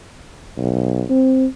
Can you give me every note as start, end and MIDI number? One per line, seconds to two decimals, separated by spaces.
0.58 1.04 35
1.10 1.46 60